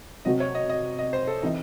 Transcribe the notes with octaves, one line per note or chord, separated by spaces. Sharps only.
C3 F#3 C4 F#4 D#5
C#5
D#5
D#5
D#5
C5
A4
E3 C4 D#4 E4